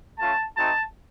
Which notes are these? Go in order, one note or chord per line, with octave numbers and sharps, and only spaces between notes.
A3 C#4 F4 A5
A3 C4 D#4 F#4 A5